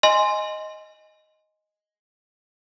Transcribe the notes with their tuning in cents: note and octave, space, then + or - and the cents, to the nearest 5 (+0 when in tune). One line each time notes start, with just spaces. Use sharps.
D#5 +0 G#5 +0 C6 +0